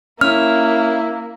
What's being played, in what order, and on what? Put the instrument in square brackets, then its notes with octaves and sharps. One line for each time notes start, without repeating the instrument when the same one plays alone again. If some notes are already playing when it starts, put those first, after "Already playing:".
[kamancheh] A#3 [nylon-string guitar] C#4 [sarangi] E4 [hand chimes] F6